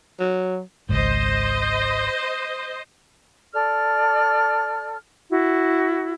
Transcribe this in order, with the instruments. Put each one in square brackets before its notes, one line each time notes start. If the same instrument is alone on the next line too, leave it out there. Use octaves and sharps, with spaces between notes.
[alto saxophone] F#3
[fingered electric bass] G#1 C#2 G#2 [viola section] C5 D#5
[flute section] A4 D5 F6
E4 F#4